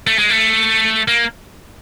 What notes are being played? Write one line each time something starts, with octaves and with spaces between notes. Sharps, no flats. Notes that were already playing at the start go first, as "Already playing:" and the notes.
A3
G#3
A3
A#3